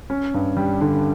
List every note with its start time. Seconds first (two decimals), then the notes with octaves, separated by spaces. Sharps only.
0.10 C#4
0.34 G2
0.57 G3
0.81 D3